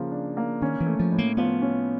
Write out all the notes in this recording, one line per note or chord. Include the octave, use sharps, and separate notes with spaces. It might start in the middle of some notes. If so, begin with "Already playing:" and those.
Already playing: C#3 F3 A#3
D4
A#3
D#3 C#4
E3
A3
F3
A2
A#3
F3 B3
C#4